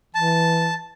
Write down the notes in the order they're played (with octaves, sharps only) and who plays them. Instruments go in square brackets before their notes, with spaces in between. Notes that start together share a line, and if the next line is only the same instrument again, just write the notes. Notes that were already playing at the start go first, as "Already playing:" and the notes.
[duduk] E3 [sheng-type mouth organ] A5